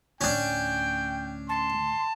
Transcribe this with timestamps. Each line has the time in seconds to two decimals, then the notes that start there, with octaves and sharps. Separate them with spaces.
0.21 D2 A2 C#4 D4 G5
1.49 A5 C6